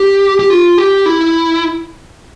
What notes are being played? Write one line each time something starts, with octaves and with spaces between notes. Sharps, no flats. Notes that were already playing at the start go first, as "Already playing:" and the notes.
Already playing: G4
G4
F4
G4
E4